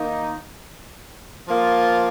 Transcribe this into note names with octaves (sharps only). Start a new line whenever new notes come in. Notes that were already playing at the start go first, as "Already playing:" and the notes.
Already playing: D#3 A#3 D#4
F3 A#3 F4